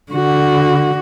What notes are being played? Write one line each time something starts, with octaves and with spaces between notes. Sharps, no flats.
D3 F#4